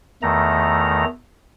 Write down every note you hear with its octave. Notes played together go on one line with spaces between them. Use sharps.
E2 D#3 A3 A#5